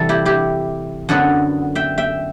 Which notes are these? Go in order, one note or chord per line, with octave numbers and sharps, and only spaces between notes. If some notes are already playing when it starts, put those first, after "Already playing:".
Already playing: C3 E3 G3 A4
E4 G4
E4 G4
F#2 D3 F#3 B3 F#4 A4
E5 G5
E5 G5